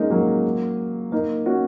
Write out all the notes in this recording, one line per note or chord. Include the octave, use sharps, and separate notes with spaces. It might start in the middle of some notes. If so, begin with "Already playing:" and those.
Already playing: G#3 A#3 C#4 D#4
F#3 A#3
A#3 D#4
C#4 F#4